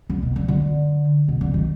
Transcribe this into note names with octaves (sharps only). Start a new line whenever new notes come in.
D3
B2
D3
D3
B2
D3
D#3